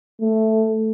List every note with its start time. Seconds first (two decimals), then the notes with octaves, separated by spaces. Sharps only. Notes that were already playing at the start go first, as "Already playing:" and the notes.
0.21 A3